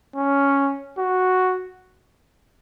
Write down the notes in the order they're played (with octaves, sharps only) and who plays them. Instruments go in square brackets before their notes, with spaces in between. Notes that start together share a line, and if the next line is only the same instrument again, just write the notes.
[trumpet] C#4
F#4